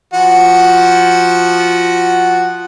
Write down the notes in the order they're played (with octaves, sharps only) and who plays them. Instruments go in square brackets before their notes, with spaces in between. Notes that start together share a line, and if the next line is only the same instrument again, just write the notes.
[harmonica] F3 F#4 F#5